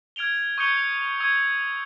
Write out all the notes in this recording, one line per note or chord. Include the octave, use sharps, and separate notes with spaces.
F6 G#6 D7 F7 G7
C#6 D#6 G6 G#6 C#7 G7
C#6 D#6 E6 G#6